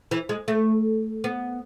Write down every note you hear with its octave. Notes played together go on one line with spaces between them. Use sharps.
E3
G#3
A3
B3